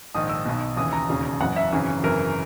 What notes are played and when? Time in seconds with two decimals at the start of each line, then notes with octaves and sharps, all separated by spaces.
0.15 A#1 G#2 D#3 D#6
0.30 E6
0.45 B1 B2
0.77 D#2 C#3 E3 D#6
0.93 A#5
1.09 E1 D#2 C#3
1.40 F#1 F#2 E3 F#5
1.56 E5
1.72 G#1 F#2 C#3 E3
2.03 G#1 F#2 C#3 E3 A#4